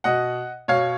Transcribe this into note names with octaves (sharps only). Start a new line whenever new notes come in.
B2 D#5 F#5
B2 C#5 F5